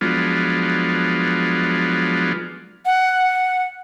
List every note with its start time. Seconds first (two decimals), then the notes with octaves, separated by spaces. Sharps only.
0.01 F3 F#3 G#3 B3 D4 F4
2.86 F#5